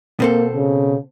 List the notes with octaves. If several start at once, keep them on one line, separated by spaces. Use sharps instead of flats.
B2 A#3 C4 A4
C#3